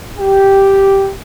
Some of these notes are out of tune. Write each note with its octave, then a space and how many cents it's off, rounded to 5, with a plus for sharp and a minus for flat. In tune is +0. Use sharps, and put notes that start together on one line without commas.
G4 -5